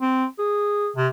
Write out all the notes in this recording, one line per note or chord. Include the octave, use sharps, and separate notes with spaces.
C4
G#4
C3